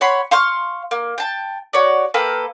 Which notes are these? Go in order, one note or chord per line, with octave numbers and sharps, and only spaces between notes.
C#5 F#5 B5 C6
F5 C6 C#6 F6
A#3
G5 A5
F#4 C#5 D5
A#3 A4 B4 G5